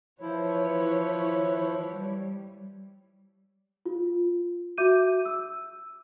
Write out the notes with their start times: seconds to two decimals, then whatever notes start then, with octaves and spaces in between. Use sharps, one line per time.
0.21 E3 F3 E4 B4 C#5
1.87 G3
3.85 F4
4.78 F#4 E5 D6 G6 D#7
5.25 E6